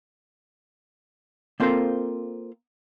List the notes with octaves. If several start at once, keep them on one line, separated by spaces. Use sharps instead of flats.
A#3 C4 F4 A4 A#4 C5